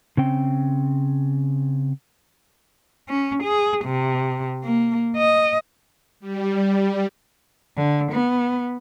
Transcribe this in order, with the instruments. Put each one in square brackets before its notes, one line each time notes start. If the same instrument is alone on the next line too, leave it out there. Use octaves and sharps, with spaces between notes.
[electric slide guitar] C#3 C4 G5
[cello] C#4
G#4
C3
A#3
D#5
[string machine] G3
[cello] D3
B3